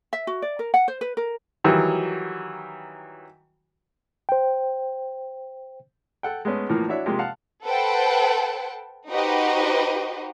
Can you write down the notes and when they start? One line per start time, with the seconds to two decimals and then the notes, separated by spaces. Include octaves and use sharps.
0.13 E5
0.27 F#4
0.42 D5
0.59 A#4
0.74 F#5
0.88 C5
1.01 B4
1.17 A#4
1.64 D#3 E3 F#3 G3 F#4
4.29 C5 G5
6.23 A4 F#5 G5
6.45 G#3 A3 B3 C#4
6.69 A2 E3 F3 A#3
6.88 D4 E4 F#4 C#5 E5
7.06 C3 F3 G#3 A#3 G4
7.19 F5 F#5 A5
7.65 A4 B4 C5 F#5 G5 A5
9.10 D#4 F#4 G4 B4 C5 D#5